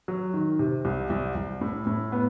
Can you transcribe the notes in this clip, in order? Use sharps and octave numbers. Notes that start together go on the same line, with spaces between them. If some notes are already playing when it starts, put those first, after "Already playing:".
F#3
D#3
C3
C2
C2
C2
A2
A2
B3